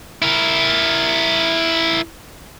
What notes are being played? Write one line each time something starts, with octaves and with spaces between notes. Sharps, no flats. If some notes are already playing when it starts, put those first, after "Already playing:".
E4 A#4